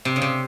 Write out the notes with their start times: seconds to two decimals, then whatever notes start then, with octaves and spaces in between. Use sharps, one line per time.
0.05 C3
0.16 C#3
0.22 C3